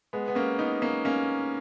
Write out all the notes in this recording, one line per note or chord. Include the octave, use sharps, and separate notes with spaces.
G#3 B3
B3
A#3 C#4
B3 D#4
A#3 C#4
A#3 C#4